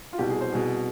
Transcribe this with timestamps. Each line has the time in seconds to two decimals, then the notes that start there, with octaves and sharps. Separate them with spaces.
0.13 F4
0.18 C2 B2 G4
0.30 G#4
0.41 C5
0.52 C2 B2 G#4